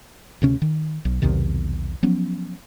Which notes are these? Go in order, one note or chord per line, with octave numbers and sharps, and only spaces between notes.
D2 C3 C#4
D#3
B1
B1 E2 C3 D#3
F3 F#3 B3 C#4